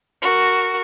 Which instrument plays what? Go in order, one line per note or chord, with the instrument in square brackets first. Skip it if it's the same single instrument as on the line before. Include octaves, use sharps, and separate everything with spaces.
[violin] F#4 A#4